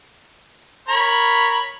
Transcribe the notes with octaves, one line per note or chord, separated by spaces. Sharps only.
A#4 C#5 B5